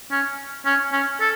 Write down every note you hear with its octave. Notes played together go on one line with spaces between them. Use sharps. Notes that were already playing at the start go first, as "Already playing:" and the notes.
C#4
C#4
C#4
A4